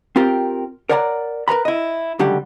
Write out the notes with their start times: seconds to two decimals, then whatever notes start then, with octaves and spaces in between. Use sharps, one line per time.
0.16 C4 F4 G4 A#4
0.89 A#4 C#5 D5 F#5 A5 A#5
1.48 A#4 B4 A#5 B5
1.65 E4 D#5
2.19 C#2 D3 F#3 G3 G4 F#5